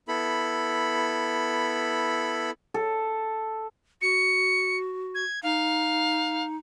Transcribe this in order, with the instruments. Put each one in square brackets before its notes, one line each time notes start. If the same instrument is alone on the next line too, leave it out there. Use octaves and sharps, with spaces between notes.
[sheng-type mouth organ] B3 E4 A4 B5
[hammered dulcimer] A4
[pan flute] F#4 [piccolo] C#7
[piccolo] G#6
[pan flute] D#4 [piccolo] F5